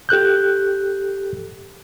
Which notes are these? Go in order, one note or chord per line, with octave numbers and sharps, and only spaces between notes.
G4 A4 F#6 G6